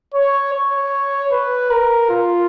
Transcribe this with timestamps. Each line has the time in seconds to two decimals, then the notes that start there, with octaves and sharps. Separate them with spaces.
0.14 C#5
0.54 C#5
1.32 B4
1.71 A#4
2.10 F4